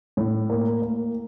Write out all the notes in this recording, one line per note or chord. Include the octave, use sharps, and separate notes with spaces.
A2
A#3
A#3